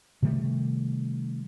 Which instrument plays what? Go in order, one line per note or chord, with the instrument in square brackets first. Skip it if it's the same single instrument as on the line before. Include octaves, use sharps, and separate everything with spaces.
[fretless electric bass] C3 D#3 G3 A3